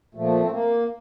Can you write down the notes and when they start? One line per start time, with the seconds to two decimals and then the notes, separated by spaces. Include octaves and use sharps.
0.15 A#2 F3 A3
0.41 C4
0.51 A#3